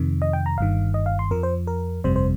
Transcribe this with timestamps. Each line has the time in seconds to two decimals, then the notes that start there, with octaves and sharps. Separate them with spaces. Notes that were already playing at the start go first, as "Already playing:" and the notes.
Already playing: F2 C3 D#3
0.22 D#5
0.33 G5
0.46 A#5
0.58 G1 G2 D#3 F5
0.94 D#5
1.06 F5
1.19 C6
1.31 F2 F3 A#4
1.43 C5
1.67 A#4
2.04 G1 F2 C3 G3 C5
2.16 C5